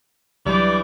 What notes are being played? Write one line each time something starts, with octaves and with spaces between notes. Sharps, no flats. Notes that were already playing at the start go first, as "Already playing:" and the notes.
C2 G2 E3 F#3 D5 G6